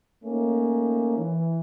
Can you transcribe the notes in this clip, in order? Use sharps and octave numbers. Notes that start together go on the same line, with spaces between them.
A3 A#3 C#4 D#4
E3